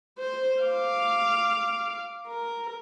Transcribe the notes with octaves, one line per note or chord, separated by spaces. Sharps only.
C5
F5 D6
A#4